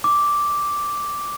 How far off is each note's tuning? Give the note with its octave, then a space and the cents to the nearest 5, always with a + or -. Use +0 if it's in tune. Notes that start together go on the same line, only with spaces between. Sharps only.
D6 -5